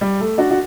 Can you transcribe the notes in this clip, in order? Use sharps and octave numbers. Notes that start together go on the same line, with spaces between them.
G3
A3
D4 F#4
F#4